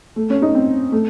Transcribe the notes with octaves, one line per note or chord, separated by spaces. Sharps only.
A3
C#4
D#4
C4
A3